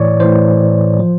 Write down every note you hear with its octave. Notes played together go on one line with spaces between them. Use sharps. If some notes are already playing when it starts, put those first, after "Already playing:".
Already playing: A2 E3 C#5 D5
A2 E3 C5
F3